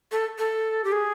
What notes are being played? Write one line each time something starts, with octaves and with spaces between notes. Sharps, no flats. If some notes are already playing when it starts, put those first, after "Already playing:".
A4
A4
G4
G#4